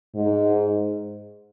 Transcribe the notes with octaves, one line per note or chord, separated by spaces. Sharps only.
G#2